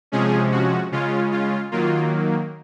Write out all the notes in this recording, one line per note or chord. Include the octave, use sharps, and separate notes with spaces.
C3 F3 G#3 C#4 G#4
F#4
C#3 G#3 C#4 F4
F4
D#3 F#3 A#3 F4